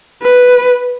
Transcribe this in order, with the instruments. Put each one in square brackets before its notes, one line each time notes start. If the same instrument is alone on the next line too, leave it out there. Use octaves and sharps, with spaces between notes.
[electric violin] B4